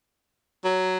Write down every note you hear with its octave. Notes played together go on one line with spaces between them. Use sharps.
F#3